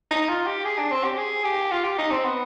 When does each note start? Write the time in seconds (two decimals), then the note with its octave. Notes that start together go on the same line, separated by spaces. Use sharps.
0.11 D#4
0.29 F4
0.46 G4
0.64 G#4
0.78 D4
0.91 C4
1.04 G4
1.17 G#4
1.44 G4
1.71 F4
1.84 G4
1.98 D#4
2.11 C4
2.25 B3